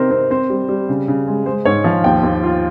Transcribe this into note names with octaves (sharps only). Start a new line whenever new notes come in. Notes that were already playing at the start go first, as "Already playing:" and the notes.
Already playing: C3 C4 D#4 A#4 C5
C4 C5
C4 C5
G3
G3
C#3
C#3
G#3
G#3 C5
G#2 C#5
F3 F5
D#2 G5
D#2
F4